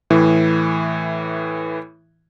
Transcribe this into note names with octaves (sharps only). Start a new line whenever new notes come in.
A2 E3